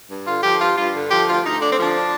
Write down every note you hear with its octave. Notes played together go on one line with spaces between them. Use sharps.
G2
D3 F4
F3 G4
G2 F4
G2 F4
D3
F3 G4
D2 F4
D2 D#4
D3 D4
C4
F3 D4